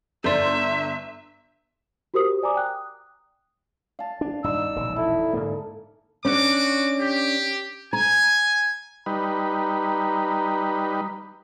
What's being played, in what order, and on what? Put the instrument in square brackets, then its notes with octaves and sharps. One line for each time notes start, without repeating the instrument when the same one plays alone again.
[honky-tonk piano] G1 C6 B6 [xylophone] A4 D5 [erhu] E5
[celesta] F#4 G4 A#4 C5 D#6
D5 G#5 A#5 D6 D#6
G5 D#6 F#6
[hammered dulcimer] F5 A5
[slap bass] D4
[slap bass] D#1 G2 D4 [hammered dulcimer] D#4 D5 [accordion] E6
[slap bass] E1 A#1 C#3
[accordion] E4 [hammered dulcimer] A4
[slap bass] G#2 D3 A#3
[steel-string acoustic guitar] C#4 D4 [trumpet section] F#4 D6
[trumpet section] G4
[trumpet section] G#5 [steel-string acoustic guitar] A#5
[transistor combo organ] G3 D#4 B4 [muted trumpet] A#5